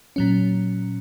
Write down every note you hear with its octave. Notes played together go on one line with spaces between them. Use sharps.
A#2 F#3 C#4